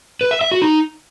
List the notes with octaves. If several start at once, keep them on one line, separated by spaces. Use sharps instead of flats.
B4
E5
E5
F#4
D#4